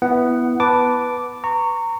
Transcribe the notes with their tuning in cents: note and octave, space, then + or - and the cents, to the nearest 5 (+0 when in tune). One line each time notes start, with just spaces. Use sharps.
B3 +0 E4 +0 F#5 +15
B4 +0 A5 +0 D6 -5
A#5 -25 C#6 +0